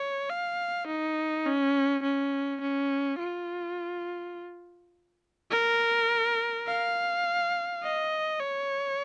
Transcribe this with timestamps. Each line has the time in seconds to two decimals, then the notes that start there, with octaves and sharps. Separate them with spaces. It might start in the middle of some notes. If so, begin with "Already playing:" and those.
Already playing: C#5
0.30 F5
0.88 D#4
1.46 C#4
2.03 C#4
2.61 C#4
3.19 F4
5.51 A#4
6.67 F5
7.83 D#5
8.40 C#5